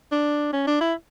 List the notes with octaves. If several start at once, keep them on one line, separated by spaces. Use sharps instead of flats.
D4
C#4
D4
E4